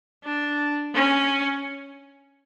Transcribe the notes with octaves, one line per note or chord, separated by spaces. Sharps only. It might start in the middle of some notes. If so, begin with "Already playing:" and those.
D4
C#4